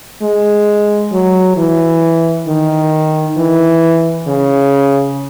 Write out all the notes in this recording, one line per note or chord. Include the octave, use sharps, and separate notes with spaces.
G#3
F#3
E3
D#3
E3
C#3